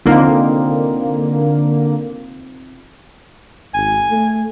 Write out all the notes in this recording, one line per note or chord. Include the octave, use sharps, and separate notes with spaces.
D3 A#3 C4 D#4 F4
G#1 G#5
A3